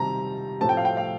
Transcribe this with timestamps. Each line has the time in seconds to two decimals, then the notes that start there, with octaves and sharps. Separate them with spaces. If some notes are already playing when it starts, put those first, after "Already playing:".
Already playing: C3 D#3 G3 C4 A5 A#5
0.61 A2 F3 A3 C4 A5
0.69 G5
0.77 F5
0.85 G5
0.97 F5